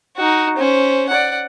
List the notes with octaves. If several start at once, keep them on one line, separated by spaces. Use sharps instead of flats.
D#4 F#4
C#4 C5
D5 F#5